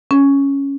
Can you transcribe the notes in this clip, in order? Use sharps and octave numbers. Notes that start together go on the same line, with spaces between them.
C#4